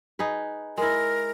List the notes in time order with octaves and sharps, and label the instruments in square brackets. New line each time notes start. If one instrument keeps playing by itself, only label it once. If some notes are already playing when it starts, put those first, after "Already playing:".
[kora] D#4 G#4 B4
[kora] G#3 E4 [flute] A#4